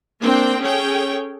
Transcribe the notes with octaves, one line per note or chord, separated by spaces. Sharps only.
A#3 C4 D4 G5
C#4 G#4 A4 C#5 G5